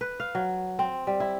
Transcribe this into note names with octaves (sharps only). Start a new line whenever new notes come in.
B4
F5
F#3
C4
G3
E4